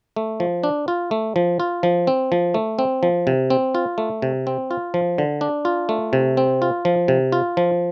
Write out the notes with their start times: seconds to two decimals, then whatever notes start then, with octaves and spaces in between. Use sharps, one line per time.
0.16 A3
0.40 F3
0.64 D4
0.88 F4
1.11 A3
1.36 F3
1.60 F4
1.83 F3
2.07 C4
2.32 F3
2.54 A3
2.79 C4
3.03 F3
3.27 C3
3.50 C4
3.75 F4
3.98 A3
4.22 C3
4.47 C4
4.71 F4
4.94 F3
5.18 D3
5.41 D4
5.65 F4
5.89 A3
6.13 C3
6.37 C4
6.62 F4
6.85 F3
7.08 C3
7.32 F4
7.57 F3